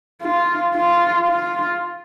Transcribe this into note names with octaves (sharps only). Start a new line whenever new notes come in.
F4
F4
F4